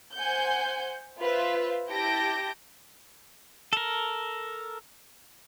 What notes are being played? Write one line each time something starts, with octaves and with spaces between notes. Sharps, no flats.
C5 F#5 G#5 G6
F4 B4 C5 E5
E4 G4 A5 G6 A#6 D7
A4 A#4